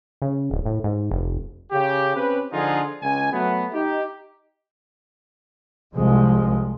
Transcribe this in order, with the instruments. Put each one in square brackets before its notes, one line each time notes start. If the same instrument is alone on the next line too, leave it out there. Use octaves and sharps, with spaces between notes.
[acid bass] C#3
D1
A2
G#2
F1
[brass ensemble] C#3 G4
C4 C#4 G4 B4
D3 F3 D#4 F4 G#4
C#2 G#5
F#3 A3 B3
D#4 G4
[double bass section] C2 F3 G#3